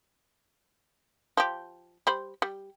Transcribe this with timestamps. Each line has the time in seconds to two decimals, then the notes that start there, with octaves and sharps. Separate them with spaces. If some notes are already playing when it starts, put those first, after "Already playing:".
1.37 F3 G4
2.07 G3 C5 B5
2.42 G3